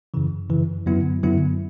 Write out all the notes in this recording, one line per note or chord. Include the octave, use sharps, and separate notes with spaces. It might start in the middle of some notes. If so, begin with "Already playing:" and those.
F#2 C#3 E3
F#2 C#3 E3
F#2 D3 F#3 B3 E4
F#2 D3 F#3 B3 E4